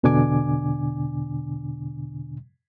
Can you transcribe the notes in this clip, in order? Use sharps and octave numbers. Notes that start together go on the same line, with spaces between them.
E2 B2 D3 D4 G#5 D6